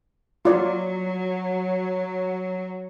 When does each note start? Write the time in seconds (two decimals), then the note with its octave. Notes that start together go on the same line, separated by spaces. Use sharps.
0.45 F#3 F4 D5